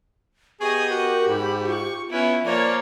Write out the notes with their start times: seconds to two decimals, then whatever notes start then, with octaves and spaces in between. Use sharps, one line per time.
0.61 B3 G4 G#4 D#5 C#6
0.90 F#4 A#4
1.27 G#2 F#4 B5
1.67 F4 C#6
2.10 B3 C#4 E4 F4
2.45 F3 A#3 C#5 D5